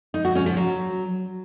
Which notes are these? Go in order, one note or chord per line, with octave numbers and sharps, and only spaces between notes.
D#4
F#4
C#4
F3
F#3